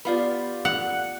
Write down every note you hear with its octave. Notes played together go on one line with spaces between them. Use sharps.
B3 F4 G4 D5 F5 B5
F#5